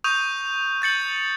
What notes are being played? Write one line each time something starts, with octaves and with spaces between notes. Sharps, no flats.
C#6 D#6 G6 D#7 F7
G6 A6 C#7 F#7